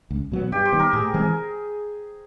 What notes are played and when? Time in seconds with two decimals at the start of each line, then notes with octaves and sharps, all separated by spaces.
0.11 C#2
0.32 B2 F#3 B3
0.52 G2 G4
0.66 C5
0.72 D#3 G3 B3
0.79 A#4
0.93 A2 G#4
1.14 E3 G#3 C4 G#4